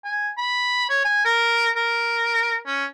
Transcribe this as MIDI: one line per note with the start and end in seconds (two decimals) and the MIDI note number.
0.04 0.30 80
0.38 0.89 83
0.89 1.04 73
1.05 1.23 80
1.25 1.70 70
1.76 2.59 70
2.67 2.85 61